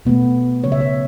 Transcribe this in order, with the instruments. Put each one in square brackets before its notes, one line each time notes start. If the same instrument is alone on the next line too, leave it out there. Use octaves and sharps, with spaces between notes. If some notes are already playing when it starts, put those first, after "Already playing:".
[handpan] B2 A3 B3
C#3 F#3 A3 C#5
E5
C#5